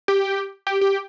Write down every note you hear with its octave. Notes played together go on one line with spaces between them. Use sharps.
G4
G4
G4